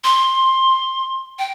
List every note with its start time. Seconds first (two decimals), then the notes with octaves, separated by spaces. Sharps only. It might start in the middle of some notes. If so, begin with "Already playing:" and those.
0.04 C6
1.39 G5